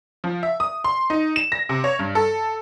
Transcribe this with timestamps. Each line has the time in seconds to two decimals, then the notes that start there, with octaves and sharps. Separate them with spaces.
0.24 F3
0.43 E5
0.60 D#6
0.84 C6
1.10 D#4
1.36 E7
1.52 A#6
1.69 C3
1.84 C#5
1.99 G2
2.15 A4